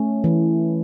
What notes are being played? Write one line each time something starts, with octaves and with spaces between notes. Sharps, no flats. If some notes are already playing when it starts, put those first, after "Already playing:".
Already playing: A3 C#4
E3